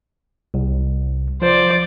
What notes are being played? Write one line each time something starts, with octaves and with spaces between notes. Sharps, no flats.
C2
F3 C5 D5